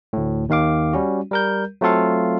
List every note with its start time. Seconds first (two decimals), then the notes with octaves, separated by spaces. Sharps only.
0.13 D2 A2
0.49 D#2 D#3 F5 D6
0.93 G3 C#4 F#4
1.31 G3 A#4 G6
1.81 F#3 A3 C4 F4 A4 F5